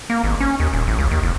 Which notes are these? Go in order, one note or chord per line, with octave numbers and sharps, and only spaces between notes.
A#3
G#1
C#4
D#2
D#1
A1
C#2
D#2
F1